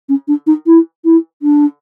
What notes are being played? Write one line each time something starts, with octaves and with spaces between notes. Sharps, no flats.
C#4
D4
D#4
E4
E4
D4